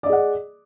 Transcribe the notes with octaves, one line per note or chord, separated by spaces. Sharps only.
G#4 D5 D#5 F#5